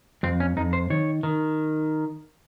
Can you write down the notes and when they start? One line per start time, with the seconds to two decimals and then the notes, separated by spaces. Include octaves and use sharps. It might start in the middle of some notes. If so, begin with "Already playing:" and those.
0.23 F2 C4
0.40 C#4
0.57 F2 D#4
0.73 C5
0.90 D#3 C#5
1.23 D#3